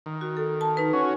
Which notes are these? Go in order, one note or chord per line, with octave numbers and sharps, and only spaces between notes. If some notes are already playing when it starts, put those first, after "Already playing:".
D#3
F#4
A4
A5
D#4 B4
C#4 F#4